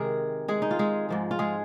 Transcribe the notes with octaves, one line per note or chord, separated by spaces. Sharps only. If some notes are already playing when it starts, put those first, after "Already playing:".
Already playing: C3 D#3 G#3 G#4 A#4
G#3 G#4
D#4
F4
G#3 G#4
G#2 F3 G#3
F4
G#3 G#4